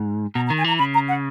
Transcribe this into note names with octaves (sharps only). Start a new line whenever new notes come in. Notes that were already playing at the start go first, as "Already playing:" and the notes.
Already playing: G#2
B2 A#5
A#5
D#3
G#5
E3 A#5
C#3 B5
A#5
F#5